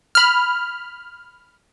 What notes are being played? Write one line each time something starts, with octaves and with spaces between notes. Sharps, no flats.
B5 F6